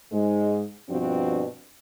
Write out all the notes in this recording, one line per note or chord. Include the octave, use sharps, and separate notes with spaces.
G#2 G#3
G2 B2 F3 C4 D4 F#4